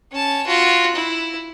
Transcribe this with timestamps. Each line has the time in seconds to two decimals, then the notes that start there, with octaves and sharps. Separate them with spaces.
0.12 C#4 A5
0.47 F4 F#4
0.95 E4